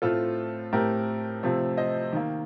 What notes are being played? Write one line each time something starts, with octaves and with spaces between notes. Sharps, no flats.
A2 A3 C4 F4 A4
A2 A3 C4 G4 A#4
C3 F3 A3 C4
C5 D#5
D#3 A#3